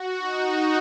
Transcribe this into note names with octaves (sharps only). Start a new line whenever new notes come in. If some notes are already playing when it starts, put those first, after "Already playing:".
Already playing: F#4
D#4